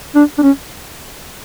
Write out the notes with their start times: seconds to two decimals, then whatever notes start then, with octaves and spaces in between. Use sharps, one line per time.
0.16 D4
0.38 D4
0.43 C#4